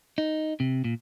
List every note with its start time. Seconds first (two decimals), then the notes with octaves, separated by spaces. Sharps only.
0.18 D#4
0.60 C3
0.84 A#2